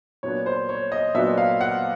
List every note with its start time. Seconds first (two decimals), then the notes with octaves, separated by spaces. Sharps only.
0.23 A#2 F#3 B3 D4 C#5
0.46 C5
0.69 C#5
0.92 D#5
1.14 A#2 F#3 B3 D4 E5
1.38 F5
1.61 F#5